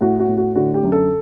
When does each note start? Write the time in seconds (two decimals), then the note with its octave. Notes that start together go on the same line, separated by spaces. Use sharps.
0.01 A2 F#4
0.19 F#4
0.28 A2
0.37 F#4
0.55 D3 F#4
0.74 G4
0.83 F#2
0.92 A4